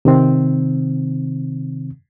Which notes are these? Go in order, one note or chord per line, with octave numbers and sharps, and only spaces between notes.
C3 D#3 C4